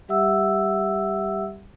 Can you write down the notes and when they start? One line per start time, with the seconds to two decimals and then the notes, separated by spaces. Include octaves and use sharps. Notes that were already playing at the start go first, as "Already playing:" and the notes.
0.08 G3 G4 E5 F#5 E6